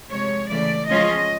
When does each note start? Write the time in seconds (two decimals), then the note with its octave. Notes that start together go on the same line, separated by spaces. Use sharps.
0.11 C3 F3 G#3 C#5
0.50 C#3 E3 A3 D5
0.88 F3 G#3 C#4 F4 D#5